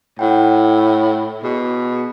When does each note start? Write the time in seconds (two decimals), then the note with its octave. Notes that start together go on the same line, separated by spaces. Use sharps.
0.19 A2 E4 F#5 G5
1.44 B2 G#4